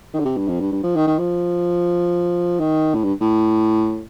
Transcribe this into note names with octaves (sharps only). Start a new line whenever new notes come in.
D#3
D3
C3
G2
F2
G2
G2
F3
D#3
D#3
F3
D#3
A2
G2
A2